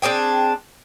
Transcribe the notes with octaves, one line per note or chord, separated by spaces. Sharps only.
C4 D4 G#4 G5